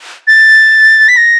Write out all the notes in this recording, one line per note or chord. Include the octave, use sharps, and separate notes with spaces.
A6
B6
A#6